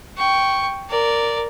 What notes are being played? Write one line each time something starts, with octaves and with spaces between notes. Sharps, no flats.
G5 C#6
A#4 D5